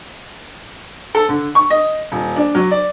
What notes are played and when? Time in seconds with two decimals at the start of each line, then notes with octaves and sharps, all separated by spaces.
1.15 A4
1.29 D3
1.55 C#6
1.70 D#5
2.12 D#1
2.36 D4
2.55 F#3
2.71 D5